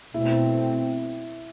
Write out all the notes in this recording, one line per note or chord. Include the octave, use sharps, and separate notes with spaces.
B2 A3 C4 E4